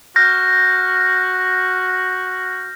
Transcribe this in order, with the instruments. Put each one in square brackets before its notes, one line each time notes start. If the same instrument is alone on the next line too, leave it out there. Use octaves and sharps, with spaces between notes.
[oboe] F#4 [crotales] F6 G6 A#6